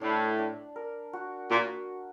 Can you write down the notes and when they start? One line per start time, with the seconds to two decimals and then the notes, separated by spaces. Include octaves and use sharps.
0.02 A2 D4
0.39 D4
0.76 A#4
1.13 F#4
1.50 A#2 F#4